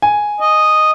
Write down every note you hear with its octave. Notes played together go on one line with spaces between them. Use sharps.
G#5
D#5